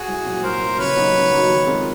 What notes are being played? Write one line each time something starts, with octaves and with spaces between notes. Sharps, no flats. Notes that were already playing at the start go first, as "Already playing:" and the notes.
Already playing: F#4 G#4
C2
A#2 F#3
C2 A#4 C5
A#2 F#3
C#3 B4 C#5
F#3 A#3 D#4 F#4
C#3
F#3 A#3 D#4 F#4
D#3
G#3 C4 F4 A#4